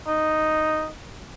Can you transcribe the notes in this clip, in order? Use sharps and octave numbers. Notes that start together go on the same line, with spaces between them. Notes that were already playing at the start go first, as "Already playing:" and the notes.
D#4